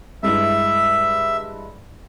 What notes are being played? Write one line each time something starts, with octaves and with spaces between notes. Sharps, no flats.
G2 G#3 E4 E5